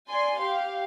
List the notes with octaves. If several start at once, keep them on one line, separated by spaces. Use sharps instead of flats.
D5 G#5 C6
G4 F5